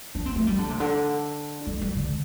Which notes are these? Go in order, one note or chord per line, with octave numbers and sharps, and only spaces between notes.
D4
C4
A3
G3
D3
C3
D3
G3
G3
D3